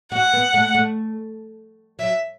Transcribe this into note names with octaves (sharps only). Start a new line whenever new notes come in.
F#4 F#5
B3
A3
A3
F#3 E5